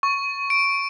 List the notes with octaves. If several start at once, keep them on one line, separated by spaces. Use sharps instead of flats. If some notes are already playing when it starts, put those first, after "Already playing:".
C#6
D7